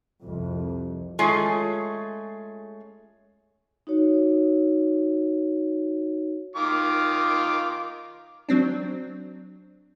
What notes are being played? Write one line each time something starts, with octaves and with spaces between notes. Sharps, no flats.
C2 F2
G#3 A3 C#4 F4 G#4
D#4 F#4 C#5
D#3 F4 D6
F#3 C4 D4